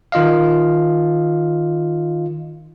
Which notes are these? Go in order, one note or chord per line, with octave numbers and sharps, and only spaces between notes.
D#3 F4 D#5 F5